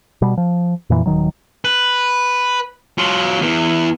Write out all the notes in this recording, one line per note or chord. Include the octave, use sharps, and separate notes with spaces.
B2 G3
F3
F2 A#2 E3
D#1 D#3 F#3
B4
F#3 F4
E2 E3